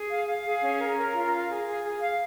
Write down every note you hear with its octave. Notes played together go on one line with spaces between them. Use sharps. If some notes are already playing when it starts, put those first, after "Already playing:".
Already playing: G#4
F5
F5
G#4
C#4
A#4
A#4
F4
F5
G#4
G#4
G#4
F5